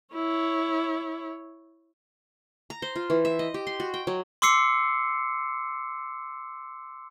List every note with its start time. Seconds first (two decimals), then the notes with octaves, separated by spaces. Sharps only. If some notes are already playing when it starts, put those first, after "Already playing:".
0.14 E4 C#5
2.70 A#5
2.82 C5
2.96 F4
3.10 E3
3.25 E5
3.39 D#5
3.54 G4
3.67 C6
3.80 F#4
3.94 G5
4.07 F#3
4.42 C6 D6 E6 C7 C#7